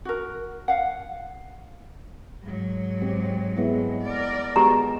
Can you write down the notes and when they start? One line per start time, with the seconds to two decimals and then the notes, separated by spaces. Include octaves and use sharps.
0.05 F#4 A#4
0.68 F5 F#5
2.42 G#2 F#3
3.02 C4 G4
3.57 G#3 B3 E4
4.02 A#4 D5
4.56 G#3 B3 F#4 G4 A#5